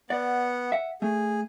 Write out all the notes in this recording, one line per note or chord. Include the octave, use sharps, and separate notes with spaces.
B3 D5 F#5
E5 F#5
A3 G#4